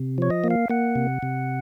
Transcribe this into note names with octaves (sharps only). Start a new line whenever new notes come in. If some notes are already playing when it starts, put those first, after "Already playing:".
Already playing: C3
F3 C#5
D#5
A#3
F5
A#3 F#5
C3
C3